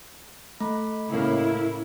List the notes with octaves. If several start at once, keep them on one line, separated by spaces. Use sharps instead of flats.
A3 B5
A2 C#3 A#3 E4